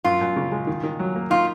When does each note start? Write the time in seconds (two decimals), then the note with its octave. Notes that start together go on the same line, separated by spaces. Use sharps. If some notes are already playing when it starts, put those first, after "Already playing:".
0.04 F#2 F4
0.21 F#2
0.36 C#3
0.52 G#3
0.67 D#3
0.84 D#3
0.99 F#3
1.16 A#3
1.30 D#4 F4